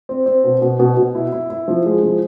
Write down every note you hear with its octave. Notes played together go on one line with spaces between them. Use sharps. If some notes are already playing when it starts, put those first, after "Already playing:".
C4
C4
B2
B2
B2
B2
E4
E4
E4
F3
G#3
F3